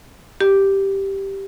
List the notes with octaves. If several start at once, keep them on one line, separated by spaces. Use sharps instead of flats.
G4